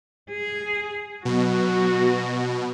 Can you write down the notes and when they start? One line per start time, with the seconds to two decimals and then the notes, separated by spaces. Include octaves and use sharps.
0.31 G#4
1.25 B2 F#3 F#4